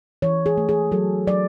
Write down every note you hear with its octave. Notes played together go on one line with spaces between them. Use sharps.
E3 C#5
G#4
A3
G#4
F#3 A4
F#3 D5